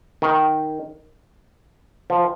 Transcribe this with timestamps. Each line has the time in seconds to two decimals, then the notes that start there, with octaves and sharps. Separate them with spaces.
0.22 D#3
2.10 F3